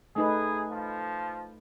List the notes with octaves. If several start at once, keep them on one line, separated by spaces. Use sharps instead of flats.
A3 D#4 G#4 B4
F3